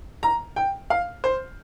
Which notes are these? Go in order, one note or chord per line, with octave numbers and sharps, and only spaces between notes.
A#5
G5
F5
C5